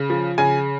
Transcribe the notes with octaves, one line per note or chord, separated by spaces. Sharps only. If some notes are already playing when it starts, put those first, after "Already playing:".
Already playing: C#3
F3
C#3 G#5